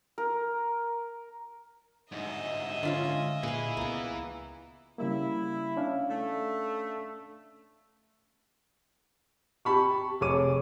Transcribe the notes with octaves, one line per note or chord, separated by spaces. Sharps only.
A#4
D2 G#2 D#5 E5
D3 C#4 F4 D5
A#2 E4 G#4 B4 F5
C#2 A#3 B3
C#3 G3 A#3 E4
C#4 D4 F5
A3
G4 A5 B5 C#6
F1 G#4 C#5 D6 D#7